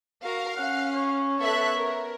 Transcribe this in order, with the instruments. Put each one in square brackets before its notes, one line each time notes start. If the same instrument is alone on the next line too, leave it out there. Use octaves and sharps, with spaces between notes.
[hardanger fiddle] F#4 A#4 [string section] F5
[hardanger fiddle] C#4 [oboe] F#5
[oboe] C#5
[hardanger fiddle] B3 [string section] A4 E5 F#6
[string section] A#4